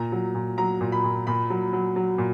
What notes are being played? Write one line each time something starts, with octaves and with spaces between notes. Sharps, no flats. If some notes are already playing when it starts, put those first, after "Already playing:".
Already playing: A#2 A#5
F#3
A#2
F#3 A#5
A#2
B5
A#2
A#2 B5
F#3
F#3
F#3
A#2